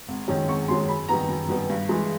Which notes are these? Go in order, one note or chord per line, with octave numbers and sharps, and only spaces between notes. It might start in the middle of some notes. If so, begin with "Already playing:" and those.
G#1
F#2 D#3 G#3 C#4
G#1 C#6
F#2 D#3 G#3 C#4 C6
F#2 B5
D#3 G3 B3 A#5
F#2
D#3 G3 B3
G2
E3 G#3